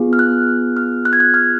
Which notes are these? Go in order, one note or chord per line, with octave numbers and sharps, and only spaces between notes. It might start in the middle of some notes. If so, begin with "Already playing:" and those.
Already playing: B3 F4 G#4
F6
F#6
F6
F#6
G#6
F#6
F6